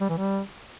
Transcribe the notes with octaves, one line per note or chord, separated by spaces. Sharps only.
G3
E3
G3